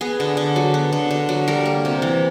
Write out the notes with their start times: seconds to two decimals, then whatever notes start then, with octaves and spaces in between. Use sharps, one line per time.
0.01 B3 G#4
0.20 D3
0.37 D3
0.56 F#3
0.74 B3
0.93 D3
1.11 D3
1.29 F#3
1.48 G3 A#4
1.66 A#3
1.85 C3
2.02 E3